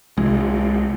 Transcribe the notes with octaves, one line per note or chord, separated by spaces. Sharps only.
C2 G#3